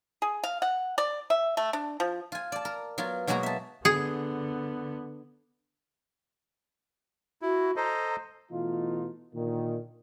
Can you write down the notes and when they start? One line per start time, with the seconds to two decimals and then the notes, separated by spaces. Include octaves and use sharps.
0.22 G#4
0.44 F5
0.62 F#5
0.98 D5
1.30 E5
1.57 A3
1.73 D4
2.00 F3
2.32 F4 G#5
2.52 D5 A5
2.65 A#4
2.98 F#3 B3 F4
3.27 B2 F#3 G#3 A#3 F#4 A#5
3.43 E5 A5
3.85 D3 B3 G#4
7.42 E4 F#4
7.76 A4 C5 D#5 A#5
8.51 B2 E3 A3 B3 D#4 F4
9.34 A#2 D3 D#3